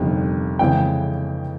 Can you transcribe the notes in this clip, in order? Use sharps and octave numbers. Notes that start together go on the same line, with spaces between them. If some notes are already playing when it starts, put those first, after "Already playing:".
Already playing: G1 F2 C3 D#3 G3
F2 C#3 E3 G#3 G5